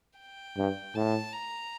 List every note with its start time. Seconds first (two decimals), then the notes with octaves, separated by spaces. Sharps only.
0.19 G5
0.57 G2
0.95 A2 A5
1.33 A#5